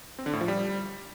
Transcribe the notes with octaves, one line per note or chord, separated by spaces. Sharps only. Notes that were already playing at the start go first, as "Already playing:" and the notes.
C4
D3
A2
F3
G3